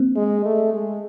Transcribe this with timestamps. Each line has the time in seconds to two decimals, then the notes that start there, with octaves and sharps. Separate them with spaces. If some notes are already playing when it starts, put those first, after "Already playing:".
Already playing: A#3 C4
0.16 G#3
0.45 A3
0.74 G#3